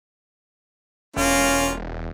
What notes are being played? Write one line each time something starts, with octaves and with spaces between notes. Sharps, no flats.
E1 A#3 C#4 F4